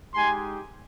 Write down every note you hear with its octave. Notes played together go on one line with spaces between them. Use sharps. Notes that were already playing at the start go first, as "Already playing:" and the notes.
G#3 D#4 G4 G#5 C6